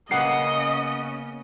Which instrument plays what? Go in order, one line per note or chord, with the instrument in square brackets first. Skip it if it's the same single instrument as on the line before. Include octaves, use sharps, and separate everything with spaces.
[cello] C#3 C#4 [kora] A#3 B3 [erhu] D#5 [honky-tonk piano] F#5 C7